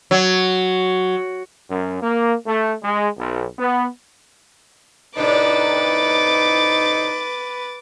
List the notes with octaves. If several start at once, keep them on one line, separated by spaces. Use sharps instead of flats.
F#3
F#2
A#3
A3
G#3
B1
B3
A2 C3 D4 D#4 B4 D6 A6